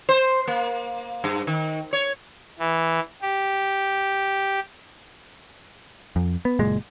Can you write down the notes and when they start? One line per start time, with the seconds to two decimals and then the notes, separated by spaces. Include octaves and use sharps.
0.09 C5
0.48 A#3
1.24 G2
1.47 D#3
1.93 C#5
2.59 E3
3.22 G4
6.16 F2
6.45 B3
6.59 F#1 A#2 G#3